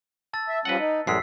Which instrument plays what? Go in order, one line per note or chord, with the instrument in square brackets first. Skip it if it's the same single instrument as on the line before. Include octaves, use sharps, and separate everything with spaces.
[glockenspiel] A5 E6 A6
[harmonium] E5
[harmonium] F3 G3 C#4 [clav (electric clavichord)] B4 D#5 F#5
[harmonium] D#4
[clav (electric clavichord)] A1 F#2 G#3 [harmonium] G3 [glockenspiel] E6 B6 C7